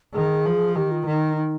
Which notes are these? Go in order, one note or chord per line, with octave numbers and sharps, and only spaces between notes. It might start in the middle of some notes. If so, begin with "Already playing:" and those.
D#3 G#4
F3
D#3 G4
F4
D#3 D#4
D#4